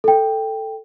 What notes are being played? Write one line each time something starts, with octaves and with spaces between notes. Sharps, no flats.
A4 G5